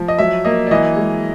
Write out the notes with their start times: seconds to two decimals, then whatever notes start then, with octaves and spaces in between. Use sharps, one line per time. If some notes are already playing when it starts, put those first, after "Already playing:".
Already playing: F3
0.08 D#5
0.18 F#3 E5
0.45 A#3 D#5
0.67 D5
0.71 E3 D#5
0.96 G#3